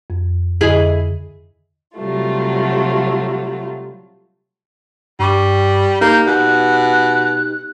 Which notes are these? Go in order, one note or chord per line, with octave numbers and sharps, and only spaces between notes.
F2
F2 D3 E4 G#4 D#5
C3 F#3 G3 A3 F4
G2 G3 C#6 D6
A#3 D#4 G4 G6
B2 F#6